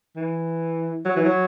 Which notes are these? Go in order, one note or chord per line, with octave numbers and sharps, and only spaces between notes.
E3
F#3
E3
F#3